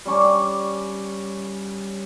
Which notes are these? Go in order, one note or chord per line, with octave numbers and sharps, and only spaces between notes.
G3 C#4 C#6 D6